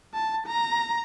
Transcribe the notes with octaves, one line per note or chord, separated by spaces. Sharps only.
A5
A#5